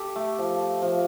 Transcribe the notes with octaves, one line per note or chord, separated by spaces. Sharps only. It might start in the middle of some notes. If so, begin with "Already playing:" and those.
Already playing: G4 A4
A3
F3
F3